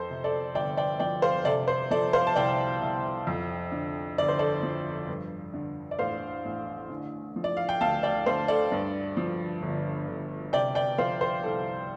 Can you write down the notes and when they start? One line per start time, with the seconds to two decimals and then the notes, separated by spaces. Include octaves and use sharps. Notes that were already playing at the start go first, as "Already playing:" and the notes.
Already playing: F2 A4 C5
0.10 C3
0.24 A4 D5
0.54 G1 D5 G5
0.77 D5 G5
0.99 F3 D5 G5
1.22 C5 F5
1.45 C3 A4 D5
1.68 C5
1.91 F3 A4 D5
2.13 C5 F5
2.27 A5
2.36 C2 D5 G5
2.82 C2
3.27 F2
3.72 D3
4.18 G1 D5
4.28 C5
4.39 A4 D5
4.63 F3
5.08 G2
5.54 D3
5.91 D5
5.99 A1 C5 F5
6.45 A1
6.89 D3
7.36 F3
7.44 D5
7.57 F5
7.69 G5
7.81 D2 F5 A5
8.03 D5 G5
8.26 D2 C5 F5
8.48 A4 D5
8.72 G2
9.17 F3
9.62 G1
10.08 G1
10.53 C3 D5 G5
10.75 D5 G5
10.98 F3 C5 F5
11.21 C5
11.43 C2 A4